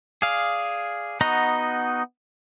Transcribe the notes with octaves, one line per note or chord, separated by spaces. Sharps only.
G#4 D5 F5
B3 D#4 F#4 D#5 A#5